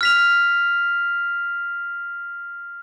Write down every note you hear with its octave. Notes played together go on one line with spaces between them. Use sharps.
F6 B6 F7